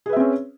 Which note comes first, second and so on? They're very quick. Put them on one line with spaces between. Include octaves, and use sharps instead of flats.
G#4 B4 E5 C4 C#4